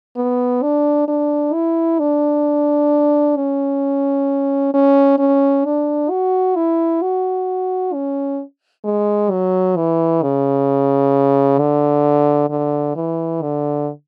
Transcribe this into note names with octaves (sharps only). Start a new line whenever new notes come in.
B3
D4
D4
E4
D4
C#4
C#4
C#4
D4
F#4
E4
F#4
C#4
G#3
F#3
E3
C#3
D3
D3
E3
D3